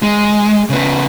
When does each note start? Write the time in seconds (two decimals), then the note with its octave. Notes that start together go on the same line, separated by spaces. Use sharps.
0.02 G#3
0.70 C#3 B3